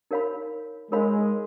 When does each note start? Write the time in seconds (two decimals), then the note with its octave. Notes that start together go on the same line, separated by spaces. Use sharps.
0.11 D#4 A#4 C#5 F5 B5
0.92 G#3 D#4 A#4 C#5 F5 B5